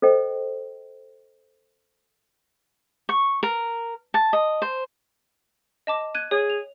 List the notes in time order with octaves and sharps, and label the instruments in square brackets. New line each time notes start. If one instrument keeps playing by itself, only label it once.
[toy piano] A4 C5 D#5 G5
[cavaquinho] C#6
A#4
A5
D#5
C5
[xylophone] D#5 A5 D6
F#6 G#6 D#7
[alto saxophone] G#4 [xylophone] C#5
[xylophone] F7